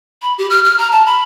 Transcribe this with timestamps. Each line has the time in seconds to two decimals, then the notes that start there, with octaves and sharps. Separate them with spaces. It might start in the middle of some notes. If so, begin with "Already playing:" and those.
0.22 B5
0.38 G4
0.50 F6
0.64 F6
0.78 A#5
0.92 A5
1.06 B5